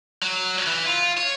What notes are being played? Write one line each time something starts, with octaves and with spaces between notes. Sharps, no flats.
F#3
E3
F4
C#5